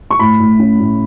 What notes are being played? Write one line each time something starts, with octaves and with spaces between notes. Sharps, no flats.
C#6
A2 B5
A2
C#4
A2